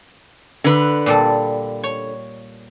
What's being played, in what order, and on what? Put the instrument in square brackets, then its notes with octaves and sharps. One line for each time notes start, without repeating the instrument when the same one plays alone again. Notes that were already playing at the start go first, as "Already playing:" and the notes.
[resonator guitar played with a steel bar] D3 B4
[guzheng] A#2 G3 A4
C#5